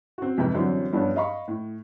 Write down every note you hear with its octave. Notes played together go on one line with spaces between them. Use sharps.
C4 F#4
F2 G#2 C3 B4 G5
F#2 D3 E3 F#3 G3 C4
G2 F3 G3 B3 C#4 D4
D#5 F5 B5 C#6
A2